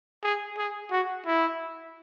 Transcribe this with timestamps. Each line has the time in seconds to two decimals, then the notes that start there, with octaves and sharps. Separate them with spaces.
0.23 G#4
0.58 G#4
0.91 F#4
1.26 E4